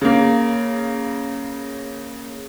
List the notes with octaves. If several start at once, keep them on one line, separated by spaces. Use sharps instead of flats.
C#3 A#3